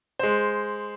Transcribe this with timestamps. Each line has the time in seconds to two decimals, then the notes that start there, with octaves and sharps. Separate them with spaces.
0.19 G#3 C5